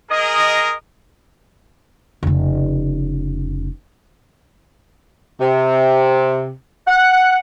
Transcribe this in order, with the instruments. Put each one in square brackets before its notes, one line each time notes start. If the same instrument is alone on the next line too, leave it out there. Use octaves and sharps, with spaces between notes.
[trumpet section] G#4 A#4 [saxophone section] D#5
[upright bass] F1 C#3
[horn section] C3
F#5